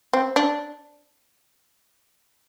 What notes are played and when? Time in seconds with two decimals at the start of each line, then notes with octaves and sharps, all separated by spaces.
0.13 C4
0.36 D4